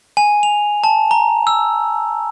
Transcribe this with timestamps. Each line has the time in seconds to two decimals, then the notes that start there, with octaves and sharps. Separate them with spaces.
0.17 G#5
0.43 F7
0.84 A5
1.11 A#5
1.47 E6